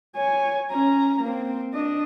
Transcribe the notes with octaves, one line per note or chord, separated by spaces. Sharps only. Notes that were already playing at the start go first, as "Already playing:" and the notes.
C#5 G#5
C#4 A#5
A#3 C4
D4 D#5